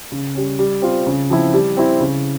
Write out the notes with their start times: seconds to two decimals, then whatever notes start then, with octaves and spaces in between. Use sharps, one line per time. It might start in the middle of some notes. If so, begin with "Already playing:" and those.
0.12 C#3
0.35 G3 C#4
0.59 G3
0.82 C4 F4
1.07 C#3
1.30 F3 C4 E4
1.54 G3
1.77 C4 E4
2.00 C#3